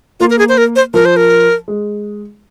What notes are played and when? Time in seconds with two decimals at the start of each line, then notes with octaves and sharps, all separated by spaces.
0.20 A#3 F4
0.30 A#4
0.39 G#4
0.49 C5
0.58 A#4
0.76 C5
0.94 F3 A#4
1.05 C5
1.16 A#4
1.68 G#3